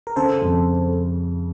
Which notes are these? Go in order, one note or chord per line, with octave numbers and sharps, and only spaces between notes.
A#4
C#3 A4 C5
F2